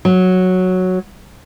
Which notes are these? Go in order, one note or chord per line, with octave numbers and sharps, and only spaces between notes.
F#3